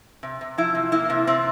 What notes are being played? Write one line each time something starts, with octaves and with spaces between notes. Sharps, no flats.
C3
C3
F3 E4
C3
A#3 E4
C3
C3 C4